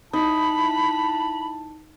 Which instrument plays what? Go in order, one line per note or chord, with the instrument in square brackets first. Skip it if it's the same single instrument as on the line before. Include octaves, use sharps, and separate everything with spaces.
[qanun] D#4 [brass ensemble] E4 A5 [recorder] B5